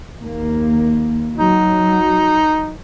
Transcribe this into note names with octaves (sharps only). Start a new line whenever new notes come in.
D#2 A#3
F#3 D#4